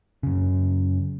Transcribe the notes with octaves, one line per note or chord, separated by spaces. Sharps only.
F#2 C#3